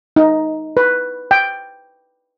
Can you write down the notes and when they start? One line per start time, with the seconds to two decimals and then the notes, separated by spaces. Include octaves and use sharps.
0.16 D#4
0.77 B4
1.31 G5